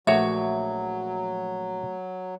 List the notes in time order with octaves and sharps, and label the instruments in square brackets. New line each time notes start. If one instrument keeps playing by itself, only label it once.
[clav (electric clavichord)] A#1 F#4 C#5 [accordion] F#3 [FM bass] A3 [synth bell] E5